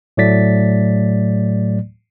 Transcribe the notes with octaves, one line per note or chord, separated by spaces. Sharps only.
A2 F#3 A3 D5 A6 B6